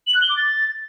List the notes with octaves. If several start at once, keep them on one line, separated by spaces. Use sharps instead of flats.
F#7
F#6
G7
D6
A6